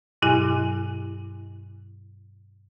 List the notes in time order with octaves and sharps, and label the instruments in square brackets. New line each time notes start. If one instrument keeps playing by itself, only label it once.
[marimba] G2 B2 F#3 E4 G4 G#5